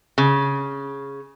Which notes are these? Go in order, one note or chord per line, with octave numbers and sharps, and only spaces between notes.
C#3